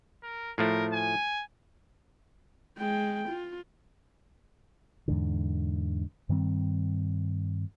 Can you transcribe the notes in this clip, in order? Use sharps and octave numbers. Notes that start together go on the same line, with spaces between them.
A#4
A2 F3 A3 A#4
G#5
G#3 G5
F4
E2 G#2 D3
G2 D#3 G3 C4